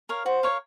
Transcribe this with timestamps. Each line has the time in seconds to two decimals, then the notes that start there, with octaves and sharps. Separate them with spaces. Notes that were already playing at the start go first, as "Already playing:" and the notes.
0.09 A#4 C#5 F5
0.26 F#4 C5
0.43 A#4 C#5 F5